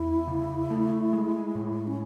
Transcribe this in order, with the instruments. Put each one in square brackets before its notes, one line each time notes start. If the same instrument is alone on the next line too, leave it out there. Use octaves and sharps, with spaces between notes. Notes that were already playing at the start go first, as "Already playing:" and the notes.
Already playing: [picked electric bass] E2 [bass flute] E4
[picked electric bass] C#3
A3
G#3
A2
[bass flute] C#4